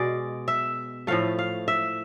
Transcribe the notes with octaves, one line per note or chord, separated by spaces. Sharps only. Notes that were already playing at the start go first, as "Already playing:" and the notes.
Already playing: B2 G#3 D5
E5
A2 F3 A3 F5
F5
E5